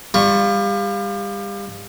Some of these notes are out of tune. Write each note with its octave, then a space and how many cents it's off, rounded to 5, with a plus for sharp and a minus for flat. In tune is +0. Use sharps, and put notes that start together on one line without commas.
G3 +35 F4 +0 C#6 +0